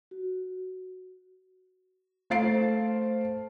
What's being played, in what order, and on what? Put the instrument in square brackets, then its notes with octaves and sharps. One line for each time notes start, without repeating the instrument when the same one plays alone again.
[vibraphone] F#4
[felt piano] A3 C5 F5 A6 C7 D7